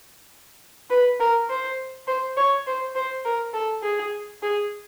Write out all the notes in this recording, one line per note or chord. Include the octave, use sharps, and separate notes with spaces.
B4
A#4
C5
C5
C#5
C5
C5
A#4
A4
G#4
G#4